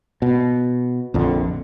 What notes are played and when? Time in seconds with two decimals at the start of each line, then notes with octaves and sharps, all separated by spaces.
0.22 B2
1.14 A#1 F2 D3